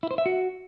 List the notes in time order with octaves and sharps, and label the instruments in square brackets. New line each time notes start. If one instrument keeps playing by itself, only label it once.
[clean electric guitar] E4
C5
E5
F#4